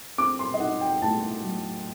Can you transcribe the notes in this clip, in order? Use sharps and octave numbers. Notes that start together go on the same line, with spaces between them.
C4 D6
C6
D#5
D#4 F#5
G5
A2 A5
F#3